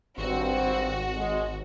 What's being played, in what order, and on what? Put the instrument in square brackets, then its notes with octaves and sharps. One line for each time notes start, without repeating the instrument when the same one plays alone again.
[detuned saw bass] G#1 [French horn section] G2 C4 [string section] F#4
[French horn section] G#3